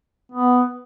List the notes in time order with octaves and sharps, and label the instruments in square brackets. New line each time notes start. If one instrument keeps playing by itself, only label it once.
[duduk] B3